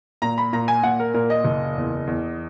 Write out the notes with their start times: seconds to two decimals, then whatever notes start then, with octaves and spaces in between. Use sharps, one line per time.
0.22 A#2 A#5
0.38 B5
0.53 A#2 A#5
0.68 G#5
0.83 A#2 F#5
1.00 A#4
1.14 A#2 A#4
1.30 D#5
1.45 F#1
1.77 E2
2.07 E2